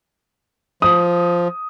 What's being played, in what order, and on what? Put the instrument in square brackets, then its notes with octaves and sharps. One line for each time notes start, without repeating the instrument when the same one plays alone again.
[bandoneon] F3 [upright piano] D#6